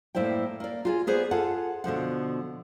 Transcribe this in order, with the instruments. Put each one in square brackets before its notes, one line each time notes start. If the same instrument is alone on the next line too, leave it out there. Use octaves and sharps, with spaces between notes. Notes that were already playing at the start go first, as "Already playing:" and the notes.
[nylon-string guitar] A2 A#3 E4 C5 D5 G5
A#3 D5
F4 F#4 G#4
A#3 B3 G#4 C5 D5 F#5
F4 G#4 A4 F#5
B2 D3 F3 F#5